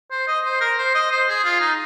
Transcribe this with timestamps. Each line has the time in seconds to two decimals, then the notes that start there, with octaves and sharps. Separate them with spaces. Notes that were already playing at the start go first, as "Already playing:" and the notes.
0.11 C5
0.28 D#5
0.45 C5
0.60 A#4
0.78 C5
0.94 D#5
1.11 C5
1.28 G#4
1.44 F4
1.61 D#4